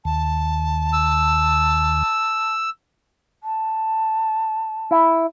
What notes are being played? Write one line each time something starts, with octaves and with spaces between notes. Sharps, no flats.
D#2 A5
E6
A5
E4